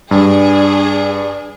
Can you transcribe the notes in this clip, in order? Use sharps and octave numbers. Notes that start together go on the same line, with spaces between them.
G2 D4 G#4